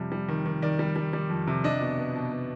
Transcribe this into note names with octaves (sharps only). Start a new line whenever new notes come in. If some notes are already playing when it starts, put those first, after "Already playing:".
Already playing: F2 C3 G3
G3
D#3
D#3
D#3 D5
G3
G3
G3
F2
C3
D4 D#5
B2
B3
B2
B2